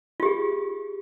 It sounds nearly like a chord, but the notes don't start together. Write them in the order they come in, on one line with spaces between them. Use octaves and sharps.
F4 G4 G#4